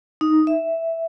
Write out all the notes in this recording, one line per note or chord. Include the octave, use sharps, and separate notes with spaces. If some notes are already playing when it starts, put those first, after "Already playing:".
D#4
E5